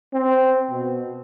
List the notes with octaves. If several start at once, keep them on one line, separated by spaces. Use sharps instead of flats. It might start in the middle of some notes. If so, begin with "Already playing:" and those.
C4
B2